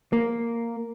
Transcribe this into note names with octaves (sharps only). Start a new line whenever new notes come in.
A#3